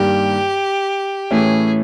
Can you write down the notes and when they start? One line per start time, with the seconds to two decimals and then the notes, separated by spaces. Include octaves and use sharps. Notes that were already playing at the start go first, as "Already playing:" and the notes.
Already playing: G2 D#3 G3 A#3 G4
1.31 A2 E3 A3 C#4 G#4